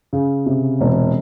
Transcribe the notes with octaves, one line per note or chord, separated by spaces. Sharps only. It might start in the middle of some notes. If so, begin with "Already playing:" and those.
C#3
C3
E1